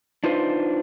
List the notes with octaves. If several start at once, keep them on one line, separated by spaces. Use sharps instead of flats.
D4 D#4 F4 B4 C5